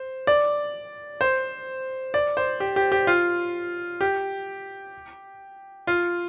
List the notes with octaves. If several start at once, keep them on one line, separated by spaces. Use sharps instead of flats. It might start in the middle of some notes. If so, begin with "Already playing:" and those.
Already playing: C5
D5
C5
D5
C5
G4
G4
G4
F4
G4
F4